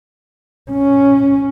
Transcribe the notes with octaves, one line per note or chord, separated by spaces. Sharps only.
C#4